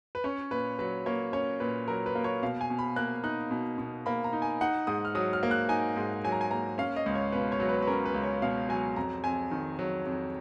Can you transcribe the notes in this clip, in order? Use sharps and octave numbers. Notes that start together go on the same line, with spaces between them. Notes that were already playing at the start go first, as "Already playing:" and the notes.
B4
C#4 C#5
A#2 B4
F#3 B4
A#3 C#5
C#4 C#5
A#2 B4
F#3 A#4
B4
A#3
C#5
B2 F5
G#5
B2
B5
A#3 F#6
D#4 F#6
B2
B2
A#3 B5
A#5
D#4
G#5
D#4 F#5
G#2 D#6
F6
F#3 D#6
F6
A#3
F#6
D#4 G#5
G#2
F#3 G#5
A#5
G#5
A#3 A#5
C#4 F5
D#5
C#2
C#5
B2 B4
C#5
F#3
B4
B4
C#4 A#4
B4
C#2
C#5
B2 F5
F#3 G#5
F2 A#5
F2 G#5
D#3
F#3
F2